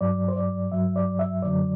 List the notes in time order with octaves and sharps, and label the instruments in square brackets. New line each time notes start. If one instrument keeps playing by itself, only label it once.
[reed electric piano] G2 F#3 D5
C5
D5
G2 F#3 E5
D5
E5
F#2 D3 F#3 D5